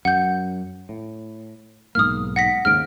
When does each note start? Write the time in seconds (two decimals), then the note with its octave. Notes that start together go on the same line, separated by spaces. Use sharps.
0.05 F#2 F#5 G6
0.89 A2
1.95 B1 G#2 A#3 D#6 F6
2.36 F#5 A#6 B6
2.65 D#2 G#2 C#3 F6 D7